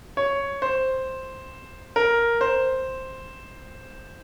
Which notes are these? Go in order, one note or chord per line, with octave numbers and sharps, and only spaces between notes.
C#5
C5
A#4
C5